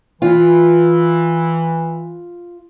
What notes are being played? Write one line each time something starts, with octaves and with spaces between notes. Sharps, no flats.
E3 F4